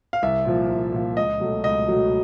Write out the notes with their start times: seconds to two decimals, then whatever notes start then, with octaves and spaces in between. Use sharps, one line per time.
0.13 F5
0.22 C2 E5
0.45 A#2 F3
0.69 C2
0.93 A#2 F3
1.17 C#2 D#5
1.40 B2 F#3 A3
1.64 C#2 D#5
1.87 B2 F#3 A3